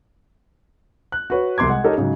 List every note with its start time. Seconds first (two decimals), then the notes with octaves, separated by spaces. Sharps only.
1.12 F#6
1.30 F#4 B4 C#5
1.58 C2 C3 C6 D6 G#6
1.69 G#3 F#5
1.84 D#4 G4 A4 A#4 C#5 D#5
1.97 G#2 C#3 F#3